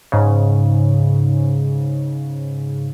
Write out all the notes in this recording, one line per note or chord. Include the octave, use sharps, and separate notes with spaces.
G#2 C#3